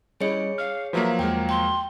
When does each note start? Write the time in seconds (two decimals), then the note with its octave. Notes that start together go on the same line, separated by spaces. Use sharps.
0.21 G3 C#4 E4 G#4 C#5 D#5 C#7
0.58 F5 F6
0.93 F3 F#3 A#3 B4 E5 F5
1.19 E2 G#3 A#4 G5
1.49 G5 C6